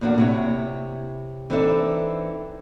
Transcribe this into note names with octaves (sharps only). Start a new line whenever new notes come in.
E2 A2 A#3 D4 F#4
C3 E4 C#5
E3 C4 D4 D#4 A4 E5